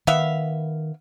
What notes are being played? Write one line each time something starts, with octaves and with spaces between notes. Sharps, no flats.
D#3 B3 E5 F5